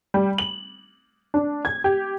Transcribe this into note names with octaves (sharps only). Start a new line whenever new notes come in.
G3
F#7
D4
G#6
G4